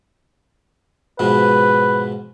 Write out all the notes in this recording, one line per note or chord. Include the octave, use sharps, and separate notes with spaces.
G#2 B2 F3 B4